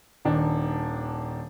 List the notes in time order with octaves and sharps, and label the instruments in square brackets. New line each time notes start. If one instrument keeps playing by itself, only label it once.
[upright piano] D#1 D#3 D4